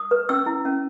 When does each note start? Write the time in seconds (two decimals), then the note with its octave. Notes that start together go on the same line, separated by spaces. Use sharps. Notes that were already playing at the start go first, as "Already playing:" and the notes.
Already playing: D#6
0.11 B4
0.29 C#4 E6
0.46 E4
0.65 C#4